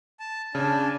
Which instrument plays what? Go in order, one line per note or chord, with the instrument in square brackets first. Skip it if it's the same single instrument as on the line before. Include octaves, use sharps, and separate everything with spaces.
[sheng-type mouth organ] A5
[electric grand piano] C#3 [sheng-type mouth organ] D4 G#5 [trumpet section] A5